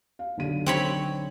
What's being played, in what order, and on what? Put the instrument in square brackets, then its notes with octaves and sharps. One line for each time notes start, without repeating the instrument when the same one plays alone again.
[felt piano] F5
B1 D3 D#7
[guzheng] C4 C#5 B5